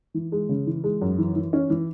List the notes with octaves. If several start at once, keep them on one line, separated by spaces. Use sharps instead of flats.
E3
G#3
C#3
E3
G#3
F#2
E3
E3
C#4
E3